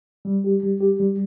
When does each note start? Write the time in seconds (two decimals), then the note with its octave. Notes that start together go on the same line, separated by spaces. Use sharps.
0.25 G3
0.44 G4
0.63 G3
0.81 G4
1.00 G3